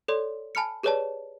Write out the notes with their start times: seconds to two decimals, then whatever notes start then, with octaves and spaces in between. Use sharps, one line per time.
0.08 A4 C#5 D5 C6
0.55 G#5 A5 B5 F6 C#7
0.83 G4 G#4 B4 C#5 D5 A5